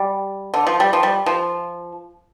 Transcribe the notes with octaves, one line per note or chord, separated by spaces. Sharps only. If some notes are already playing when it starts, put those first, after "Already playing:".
Already playing: G3
D3
F3
G3
F3
G3
F3